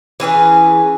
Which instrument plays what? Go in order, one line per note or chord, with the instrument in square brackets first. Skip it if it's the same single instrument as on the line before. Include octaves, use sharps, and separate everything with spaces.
[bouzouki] E3 C#4 G#4 B4